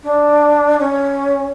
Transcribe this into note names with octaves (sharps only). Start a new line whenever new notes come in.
D4
C#4